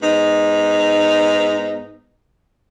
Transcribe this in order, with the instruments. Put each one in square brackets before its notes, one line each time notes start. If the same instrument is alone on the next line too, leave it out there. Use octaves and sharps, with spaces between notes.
[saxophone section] G#2 B3 D#4